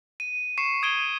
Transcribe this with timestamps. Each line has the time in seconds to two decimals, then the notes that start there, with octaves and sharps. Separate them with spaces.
0.20 D#7
0.58 C#6 C7 C#7 E7
0.82 D#6 G#6 D7 D#7 G7